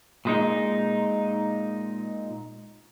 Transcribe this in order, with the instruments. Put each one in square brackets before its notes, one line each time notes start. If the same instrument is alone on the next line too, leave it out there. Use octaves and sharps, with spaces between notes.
[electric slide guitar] A#2 G#3 D#4